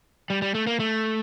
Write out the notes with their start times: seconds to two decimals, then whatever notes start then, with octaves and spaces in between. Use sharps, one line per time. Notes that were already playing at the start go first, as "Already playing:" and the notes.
0.30 G3
0.42 G3
0.55 A3
0.67 A#3
0.80 A3